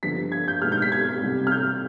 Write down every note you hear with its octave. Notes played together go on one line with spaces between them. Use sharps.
G1 G2 D3 F3 B6
G#6
G6
B1 B2 G#3 F6
G6
B6
G#6
C2 C3 G3
F6
G6